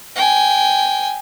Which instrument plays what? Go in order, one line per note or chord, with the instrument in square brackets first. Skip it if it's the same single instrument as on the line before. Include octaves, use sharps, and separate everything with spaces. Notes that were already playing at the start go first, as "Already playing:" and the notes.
[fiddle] G5 G#5